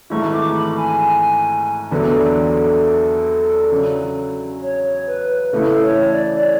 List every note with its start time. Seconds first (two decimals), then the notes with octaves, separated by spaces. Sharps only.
0.10 G#1 G#2 E3 A3 C#6
0.34 D6
0.56 B5
0.78 G#5
1.91 E2 D3 F#3 B3 D4 A4
3.71 C#3 F#3 C#4
4.62 C#5
5.07 B4
5.52 C#3 E3 A3 E4 A4
5.83 C#5
6.12 D5
6.42 C#5